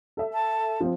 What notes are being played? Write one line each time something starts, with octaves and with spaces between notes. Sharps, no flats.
A4 E5
A5
F3 C4